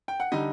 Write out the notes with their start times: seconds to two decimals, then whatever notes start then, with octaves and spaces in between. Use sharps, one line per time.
0.08 G5
0.20 F#5
0.32 D3 G3 D#4 D#5